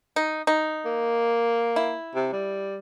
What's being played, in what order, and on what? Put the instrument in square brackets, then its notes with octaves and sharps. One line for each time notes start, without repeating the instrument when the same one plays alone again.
[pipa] D#4
D#4
[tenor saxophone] A#3
[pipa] E4
[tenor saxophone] C3
G3